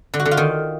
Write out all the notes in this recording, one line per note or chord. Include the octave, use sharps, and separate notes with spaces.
D3
F#4
D3
F4
D#3